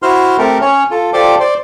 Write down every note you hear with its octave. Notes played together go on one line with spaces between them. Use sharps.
E4 F#4 C5 C6 F6
A3 C4 G4 A4 A#4
C#4 C#5
F4 A4
F4 G4 A4 C5 D5 D6
C5 D5